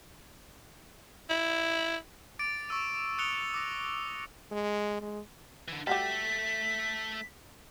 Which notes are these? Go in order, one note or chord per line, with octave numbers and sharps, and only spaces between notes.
E4
D6 A6 D7
C#6 D6 E6 D#7
D#6 F#6 C#7 D7 F7 G7
D6 D#6 A#6
G#3
G#3
D3 E3
G3 A3 F#4 G4 A4 B6